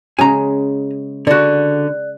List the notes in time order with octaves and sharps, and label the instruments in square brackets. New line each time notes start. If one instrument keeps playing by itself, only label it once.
[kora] C#3 G#3 [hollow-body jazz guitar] G#5 A#5
[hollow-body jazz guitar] D3 F#4 [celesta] D5 F#6